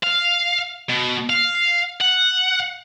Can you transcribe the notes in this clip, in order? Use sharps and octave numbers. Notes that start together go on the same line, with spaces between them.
F5
B2
F5
F#5